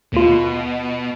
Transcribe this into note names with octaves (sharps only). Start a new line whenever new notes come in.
D#2 B2 F4